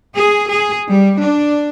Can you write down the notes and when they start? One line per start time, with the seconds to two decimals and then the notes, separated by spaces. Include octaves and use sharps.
0.15 G#4
0.51 G#4
0.88 G3
1.22 D4